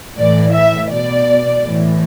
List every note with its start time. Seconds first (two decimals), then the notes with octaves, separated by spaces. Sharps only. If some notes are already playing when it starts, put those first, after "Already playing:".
0.17 A2 E3 D5
0.53 E5
0.90 B2 D5
1.64 A2 E3